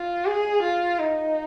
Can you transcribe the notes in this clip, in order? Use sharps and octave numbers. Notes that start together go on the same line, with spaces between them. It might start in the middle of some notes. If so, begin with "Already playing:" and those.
Already playing: F4
G#4
F4
D#4